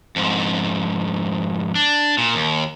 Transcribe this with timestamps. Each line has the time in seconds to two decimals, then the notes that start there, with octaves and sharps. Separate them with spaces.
0.16 F2 G#2
1.75 D4
2.18 A#2
2.35 D#2